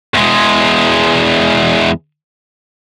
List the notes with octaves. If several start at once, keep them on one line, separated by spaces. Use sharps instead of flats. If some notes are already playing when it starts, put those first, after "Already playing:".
E2 G#3